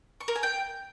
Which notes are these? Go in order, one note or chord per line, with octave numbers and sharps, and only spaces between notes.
C#6
A#4
G#5
G5